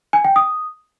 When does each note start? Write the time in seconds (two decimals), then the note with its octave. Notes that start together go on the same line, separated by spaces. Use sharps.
0.13 G#5
0.25 G5
0.36 D#6